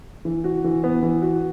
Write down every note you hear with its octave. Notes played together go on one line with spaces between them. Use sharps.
E3
F#4
E3
B3
E3
F#4